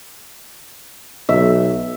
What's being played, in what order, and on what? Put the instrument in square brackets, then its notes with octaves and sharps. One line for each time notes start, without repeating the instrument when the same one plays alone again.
[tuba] B1 [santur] E5